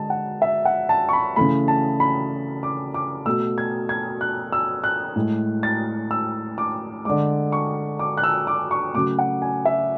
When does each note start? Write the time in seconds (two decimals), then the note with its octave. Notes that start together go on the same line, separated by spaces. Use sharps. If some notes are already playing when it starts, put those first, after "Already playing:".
Already playing: D3 G#3 A5
0.10 F#5
0.42 E5
0.65 F#5
0.89 A5
1.09 C#6
1.13 B5
1.36 C#3 E3 A3 B5
1.68 A5
2.00 B5
2.63 D6
2.94 D6
3.26 B2 A3 E6
3.58 G#6
3.89 G#6
4.21 F#6
4.52 E6
4.84 F#6
5.16 A2 G#3
5.63 A6
6.11 E6
6.58 D6
7.05 D3 G#3 D6
7.52 C#6
7.99 D6
8.17 F#6
8.24 E6
8.47 D6
8.71 C#6
8.94 C#3 F#3 A3 D6
9.19 F#5
9.42 G#5
9.65 E5